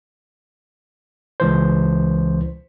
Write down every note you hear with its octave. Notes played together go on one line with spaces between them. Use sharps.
C#2 E3 C5